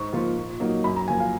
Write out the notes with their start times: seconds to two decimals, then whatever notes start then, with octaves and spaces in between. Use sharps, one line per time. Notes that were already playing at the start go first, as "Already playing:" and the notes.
Already playing: G#2 C#6
0.13 F3 A#3 F4
0.36 A#2
0.60 F#3 A#3 D#4
0.84 F#2 B5
0.96 A#5
1.08 F3 A#3 G#5
1.20 F5